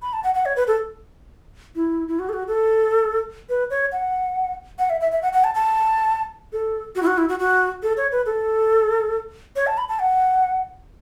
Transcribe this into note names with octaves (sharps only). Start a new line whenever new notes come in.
B5
A5
F#5
F#5
C#5
B4
A4
E4
E4
F#4
A4
F#4
A4
B4
C#5
F#5
F#5
E5
E5
E5
F#5
F#5
A5
A5
A4
F#4
E4
F#4
E4
F#4
F#4
A4
C#5
B4
A4
C#5
A5
B5
A5
F#5